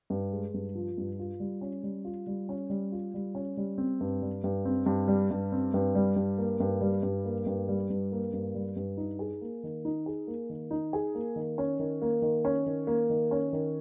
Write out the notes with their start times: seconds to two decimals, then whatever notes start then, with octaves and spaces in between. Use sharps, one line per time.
0.10 G2
0.32 G#3
0.54 G2
0.75 F3
0.98 G2
1.19 F4
1.40 G3
1.61 C#4
1.83 G3
2.05 F4
2.27 G3
2.49 C#4
2.70 G3
2.92 F4
3.14 G3
3.35 C#4
3.57 G3
3.78 C4
4.01 G2
4.22 G3
4.44 G2
4.65 C4
4.86 G2
5.08 G3
5.31 G2
5.52 C4
5.74 G2
5.95 G3
6.16 G2
6.38 A#3
6.60 G2
6.81 G3
7.03 G2
7.25 A#3
7.46 G2
7.68 G3
7.90 G2
8.12 A#3
8.33 G2
8.55 G3
8.76 G2
8.97 D#4
9.19 G#4
9.41 A#3
9.63 D#3
9.85 D#4
10.06 G#4
10.27 A#3
10.50 D#3
10.71 D#4
10.93 G#4
11.15 A#3
11.36 D#3
11.58 C#4
11.79 D#3
12.02 A#3
12.22 D#3
12.45 C#4
12.66 D#3
12.87 A#3
13.10 D#3
13.31 C#4
13.53 D#3